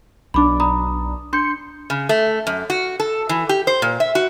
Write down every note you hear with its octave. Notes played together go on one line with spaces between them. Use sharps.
B1 D4 B5 D6
A#5 B5 D#6
D4 C6 G6 C#7
C#3
A3
F#2
F#4
A4
E3
G4
C5
A#2
E5
F#4